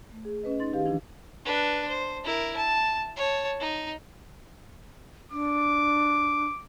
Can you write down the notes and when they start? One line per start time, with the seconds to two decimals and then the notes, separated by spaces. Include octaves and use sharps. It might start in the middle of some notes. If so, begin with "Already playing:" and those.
0.12 A3
0.25 G#4
0.43 C#4 B4 D#5
0.60 D#4 C6 A6
0.73 D#3 G4 B4 F5
0.86 E3 F3 D4 E4
1.45 D4 B4
1.88 C5
2.24 E4 A#4
2.57 A5
3.16 C#5 A5
3.60 D#4
5.32 D4 D6